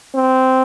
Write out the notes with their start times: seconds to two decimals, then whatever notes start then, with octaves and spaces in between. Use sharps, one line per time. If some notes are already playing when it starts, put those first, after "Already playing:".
0.15 C4